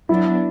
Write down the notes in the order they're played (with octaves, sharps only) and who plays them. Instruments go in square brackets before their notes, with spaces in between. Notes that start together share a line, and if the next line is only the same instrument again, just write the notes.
[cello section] F#3 B3 D4 [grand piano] E4